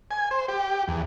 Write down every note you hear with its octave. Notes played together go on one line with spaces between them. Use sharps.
G#5
C5
G4
E2